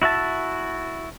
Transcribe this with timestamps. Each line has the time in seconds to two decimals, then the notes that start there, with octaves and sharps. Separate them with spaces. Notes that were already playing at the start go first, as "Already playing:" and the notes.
0.02 E4 F#4 E5 A5